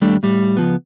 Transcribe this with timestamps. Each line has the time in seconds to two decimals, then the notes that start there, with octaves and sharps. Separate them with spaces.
0.01 D#2 G3 A3 D4
0.23 A2 G3
0.57 C#2 F3 B3